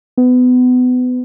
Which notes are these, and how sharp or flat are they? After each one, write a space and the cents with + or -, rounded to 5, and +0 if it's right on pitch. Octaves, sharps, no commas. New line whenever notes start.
B3 +25